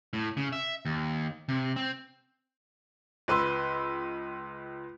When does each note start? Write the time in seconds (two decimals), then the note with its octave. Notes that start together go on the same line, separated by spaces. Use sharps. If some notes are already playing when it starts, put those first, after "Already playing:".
0.13 A2
0.37 C#3
0.53 E5
0.85 D#2
1.49 C3
1.76 C4
3.28 C#2 B4 C6 E6